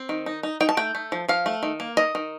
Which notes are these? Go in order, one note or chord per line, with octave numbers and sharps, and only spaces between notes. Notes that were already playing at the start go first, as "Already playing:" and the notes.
Already playing: C4
D#3
D#4
D#4
D#4 G5
A5
A3 G5
A3
F3
F3 F5
A3
D#3
A#3
D#3 D#5
D#3